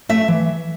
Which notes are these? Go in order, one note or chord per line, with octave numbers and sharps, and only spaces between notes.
A3 E5
E3